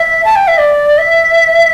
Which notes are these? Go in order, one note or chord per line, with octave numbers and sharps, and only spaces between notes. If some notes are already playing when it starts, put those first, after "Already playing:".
Already playing: E5
A5
G5
E5
D5
E5